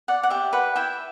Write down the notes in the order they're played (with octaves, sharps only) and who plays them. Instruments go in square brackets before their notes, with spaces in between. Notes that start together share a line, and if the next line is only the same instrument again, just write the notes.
[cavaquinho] D5 F#5
F#5
G4 E5
B4 F#5
E4 E5 G5